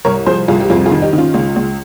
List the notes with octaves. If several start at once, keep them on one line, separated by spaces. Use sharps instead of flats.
C2 A#4 C#5
F3 G#4 C5
C2 F4 G#4
G4
F2 F4 G#4
F4 G#4
D#3
D#4 G4
D#3
C#4 F4
C#2
C#2